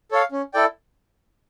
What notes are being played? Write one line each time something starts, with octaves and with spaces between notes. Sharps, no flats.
A4 C#5 F5
C#4
E4 A4 D5 G5